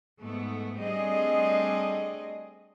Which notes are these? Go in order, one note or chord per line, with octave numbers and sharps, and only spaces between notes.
G#2 A3 B3
G3 A3 C4 D4 G#4 D#5